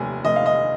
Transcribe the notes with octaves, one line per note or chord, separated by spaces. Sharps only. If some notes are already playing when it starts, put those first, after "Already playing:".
Already playing: F1 D#2 G#5
F1 D#5
F5
D#5